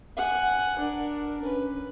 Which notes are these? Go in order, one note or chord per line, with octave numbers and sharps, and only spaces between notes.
F#5 G#5
D4 A#4
C#4 B4